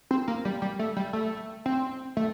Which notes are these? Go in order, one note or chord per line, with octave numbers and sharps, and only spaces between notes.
C4
A#3
G3
G3
A3
G3
A3
C4
A3